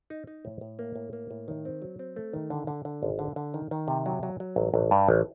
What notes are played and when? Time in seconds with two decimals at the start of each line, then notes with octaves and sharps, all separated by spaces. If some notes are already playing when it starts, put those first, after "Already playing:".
0.10 D#4
0.27 D#4
0.45 A2
0.61 A2
0.79 A#3
0.96 A2
1.13 A#3
1.31 A2
1.48 D#3
1.65 C4
1.82 F#3
1.99 C4
2.16 A3
2.33 D#3
2.50 D3
2.67 D3
2.85 D3
3.03 G#1
3.19 D3
3.36 D3
3.54 D#3
3.71 D#3
3.88 C3
4.06 F#3
4.23 F#3
4.40 F#3
4.56 A1
4.74 A1
4.91 G2
5.09 A1